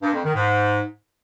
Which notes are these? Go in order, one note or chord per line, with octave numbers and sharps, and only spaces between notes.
G2
F2
D#3
G#2